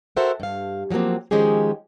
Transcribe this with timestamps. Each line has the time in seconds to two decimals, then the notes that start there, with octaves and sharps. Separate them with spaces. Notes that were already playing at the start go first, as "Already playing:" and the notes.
0.17 F#4 A4 A#4 C5 E5 F#5
0.40 G2 F5
0.90 F3 F#3 G#3 A#3 C4
1.31 D#3 F3 G#3 C#4 G4 G#4